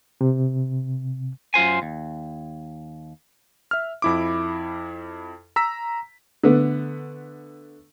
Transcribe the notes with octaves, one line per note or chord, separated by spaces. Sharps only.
C3
F#2 F4 C5 G#5
D#2
E5 F6
F2 E4 D6
A#5 E6 B6
D3 A3 B3